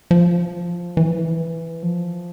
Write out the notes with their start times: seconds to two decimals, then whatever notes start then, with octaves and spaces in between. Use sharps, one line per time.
0.11 F3
0.97 E3
1.83 F3